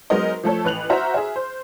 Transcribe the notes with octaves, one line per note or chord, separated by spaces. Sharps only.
F#3 G#3 B3 A#4 C5 D#5
F3 A3 A4 C#5
A1 B4 F#6 F7 F#7
F#4 C5 E5 A#5 F6
G#4 E5
C5